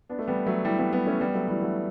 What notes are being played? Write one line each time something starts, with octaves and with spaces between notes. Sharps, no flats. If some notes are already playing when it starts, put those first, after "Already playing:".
B3 D4
A3
G3 B3
F#3 A3
E3 G3
G3 B3
G3 B3
A3 C#4
G3 B3
F#3 A3
E3 G3
F#3 A3